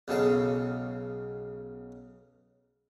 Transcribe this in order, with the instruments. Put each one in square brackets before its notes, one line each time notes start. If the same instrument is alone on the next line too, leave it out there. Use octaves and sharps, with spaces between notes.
[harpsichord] B1 C#3 A4 F5